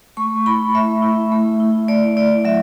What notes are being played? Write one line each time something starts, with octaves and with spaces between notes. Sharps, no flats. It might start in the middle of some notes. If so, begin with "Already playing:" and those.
A3 C#6
E4 B5
A3 E5
E4
A3
E4
A3 D5
E4 D5
F#3 E5